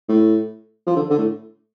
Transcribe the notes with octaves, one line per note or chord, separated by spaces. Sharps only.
A2
F3
D3
D3
A2